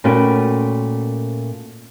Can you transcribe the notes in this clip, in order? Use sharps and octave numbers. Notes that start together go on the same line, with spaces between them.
A#2 A3 C#4 F#4 B4 G5